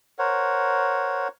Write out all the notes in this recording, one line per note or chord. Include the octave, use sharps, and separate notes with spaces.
A#4 C5 C#5 F#5